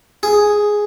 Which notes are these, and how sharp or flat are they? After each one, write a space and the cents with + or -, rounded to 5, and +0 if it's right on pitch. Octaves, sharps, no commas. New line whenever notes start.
G#4 +0